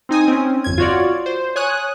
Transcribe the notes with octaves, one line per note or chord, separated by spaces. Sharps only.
C4 D#4 G#5 D#6
C4 C#4
G1 F2 G#6
F4 F#4 C#5 D5
C5
C#5 G#5 D#6 F#6